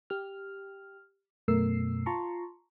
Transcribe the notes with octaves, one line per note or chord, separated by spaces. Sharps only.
G4 F6
F#2 B2 A3 A#4 E6 C7
F4 A5 A#5 C6 C#6